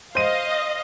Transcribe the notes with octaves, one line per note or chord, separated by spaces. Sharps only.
C5 D#5 F5 D#7